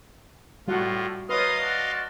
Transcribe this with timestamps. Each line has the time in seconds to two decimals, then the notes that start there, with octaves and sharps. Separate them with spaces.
0.68 A2 G3 F4 F#4 F#5
1.29 F4 A#4 B4 C#5 D#5 F5 C6 D#6
1.59 F#4 D5 A5